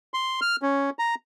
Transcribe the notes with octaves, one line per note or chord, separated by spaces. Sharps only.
C6
F6
C#4
A#5